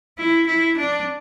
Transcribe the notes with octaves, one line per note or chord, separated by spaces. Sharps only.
E4
E4
D4